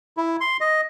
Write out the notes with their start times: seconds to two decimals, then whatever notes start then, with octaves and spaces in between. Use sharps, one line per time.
0.17 E4
0.41 C6
0.61 D#5